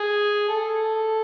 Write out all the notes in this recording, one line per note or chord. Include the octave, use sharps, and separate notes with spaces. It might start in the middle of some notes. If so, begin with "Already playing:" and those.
Already playing: G#4
A4